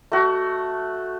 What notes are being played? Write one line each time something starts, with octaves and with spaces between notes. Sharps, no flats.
A3 F#4